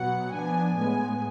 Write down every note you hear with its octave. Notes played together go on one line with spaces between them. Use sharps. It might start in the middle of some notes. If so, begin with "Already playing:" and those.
Already playing: B2 F#3 B3 F#5
F3 B3 D4 G#5
A2 G#3 B3 G#5